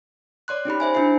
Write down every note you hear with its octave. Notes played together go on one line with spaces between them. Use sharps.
C#5 D5 C6 F#6
C#4 D#4 G4 B5
C5 E5 G#5
D4 E4 C5 E5 C7